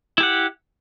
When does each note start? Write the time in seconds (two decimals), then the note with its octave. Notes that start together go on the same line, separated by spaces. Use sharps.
0.18 E4
0.20 G4
0.23 F#5